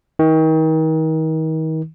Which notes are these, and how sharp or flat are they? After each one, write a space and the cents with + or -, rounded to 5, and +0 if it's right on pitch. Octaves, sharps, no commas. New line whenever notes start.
D#3 +35